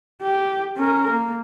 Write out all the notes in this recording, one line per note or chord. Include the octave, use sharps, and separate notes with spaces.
G4
C#4 A#4
A#3